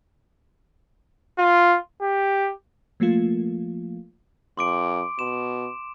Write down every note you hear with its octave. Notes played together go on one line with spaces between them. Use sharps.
F4
G4
F3 A3 A#3 F4
F2 C6 D6 D7
B2 C6 E7